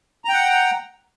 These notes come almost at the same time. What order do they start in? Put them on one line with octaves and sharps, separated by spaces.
A#5 G5 F#5